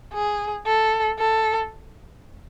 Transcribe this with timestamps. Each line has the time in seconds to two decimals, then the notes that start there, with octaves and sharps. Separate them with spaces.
0.13 G#4
0.66 A4
1.19 A4